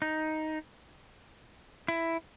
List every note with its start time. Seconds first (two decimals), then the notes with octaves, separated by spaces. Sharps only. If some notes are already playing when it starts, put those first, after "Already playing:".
0.02 D#4
1.88 E4